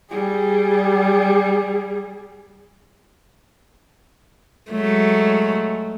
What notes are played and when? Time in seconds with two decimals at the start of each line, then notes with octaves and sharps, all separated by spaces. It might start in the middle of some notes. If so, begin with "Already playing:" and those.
0.10 G3 G#4
4.71 F#3 G#3 A3